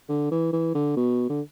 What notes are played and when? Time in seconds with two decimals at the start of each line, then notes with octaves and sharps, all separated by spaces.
0.09 D3
0.31 E3
0.53 E3
0.75 D3
0.97 B2
1.29 D3